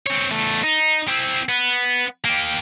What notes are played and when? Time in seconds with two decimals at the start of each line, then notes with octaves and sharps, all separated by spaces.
0.06 C4 C#5
0.31 E2 A3
0.64 D#4
1.08 C4 E4
1.49 B3
2.25 A#3 G4